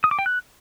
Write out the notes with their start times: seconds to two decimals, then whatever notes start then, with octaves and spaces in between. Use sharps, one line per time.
0.04 D#6
0.11 D6
0.19 G5
0.26 F#6